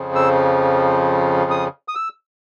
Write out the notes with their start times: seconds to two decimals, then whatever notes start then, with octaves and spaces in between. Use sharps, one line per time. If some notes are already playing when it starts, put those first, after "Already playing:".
Already playing: F2 C#3 F3
0.15 E6
1.51 D#6
1.88 D#6
1.95 E6